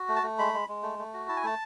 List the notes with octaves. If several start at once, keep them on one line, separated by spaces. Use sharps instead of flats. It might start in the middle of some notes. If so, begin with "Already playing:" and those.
Already playing: F#4
A3
A5
A3
G#3 B5
G#3
G#3
A3
A3
F#4
E4 A5
G#5
A3 A5